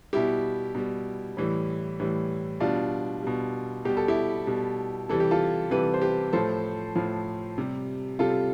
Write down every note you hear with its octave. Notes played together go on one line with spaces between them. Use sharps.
B2 G3 E4 G4
B2 G3
A2 E3 G3
A2 E3 G3
B2 G3 D4 F4
B2 G3
B2 G3 G4
A4
E4 G4
B2 G3
C3 E3 G3 A4
G4
F4 A4
C3 E3 G3 G4 B4
C5
G4 B4
A2 F3 A4 C5
A2 F3
C3 G3
C3 G3 F4 A4